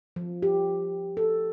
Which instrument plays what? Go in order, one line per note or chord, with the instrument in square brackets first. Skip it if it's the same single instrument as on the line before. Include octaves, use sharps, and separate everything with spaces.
[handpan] F3
G4
A4